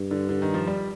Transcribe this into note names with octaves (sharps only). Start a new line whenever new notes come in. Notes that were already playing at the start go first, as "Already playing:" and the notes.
Already playing: G2
D3
D3
D#3
F3
G3